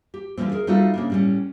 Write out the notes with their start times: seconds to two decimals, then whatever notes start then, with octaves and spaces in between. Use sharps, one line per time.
0.14 G4
0.37 D3 E3 F3 G3 C4
0.52 G#4 A#4
0.67 G3 A3 D#4 F4 F#4 A4
0.94 C#3 A#3 D4
1.10 A2 G3 C#4